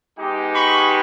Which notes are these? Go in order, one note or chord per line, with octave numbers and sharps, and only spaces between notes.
G#3 B3 D#4 G4
B5 C#6